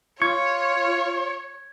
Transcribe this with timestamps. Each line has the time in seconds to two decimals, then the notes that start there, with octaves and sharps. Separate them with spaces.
0.22 F4 C#5 C#6 G#6